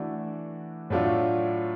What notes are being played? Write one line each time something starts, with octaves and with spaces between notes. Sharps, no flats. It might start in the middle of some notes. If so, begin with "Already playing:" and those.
Already playing: E3 A3 D4 F#4
A2 F#3 A3 D4 F4